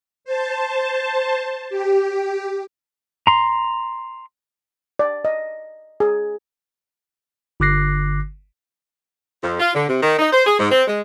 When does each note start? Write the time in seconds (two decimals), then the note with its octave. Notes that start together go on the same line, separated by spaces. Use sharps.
0.25 C5 A5
1.70 G4
3.27 A#5 C6
4.99 D5
5.25 D#5
6.00 G#4
7.60 G1 D3 D6 F#6 A#6 C7
9.42 F2
9.60 F4
9.74 D3
9.88 C3
10.01 D#3
10.18 D#4
10.32 C5
10.45 G#4
10.59 G#2
10.70 C4
10.87 G#3